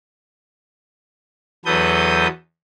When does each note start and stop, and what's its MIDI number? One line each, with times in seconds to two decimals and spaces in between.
1.66 2.27 40
1.66 2.27 54
1.66 2.27 69
1.66 2.27 71
1.66 2.27 87
1.66 2.27 91